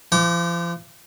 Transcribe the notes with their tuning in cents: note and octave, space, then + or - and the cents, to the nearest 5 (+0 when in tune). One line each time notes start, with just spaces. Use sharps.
F3 -35 G5 -45 D6 -10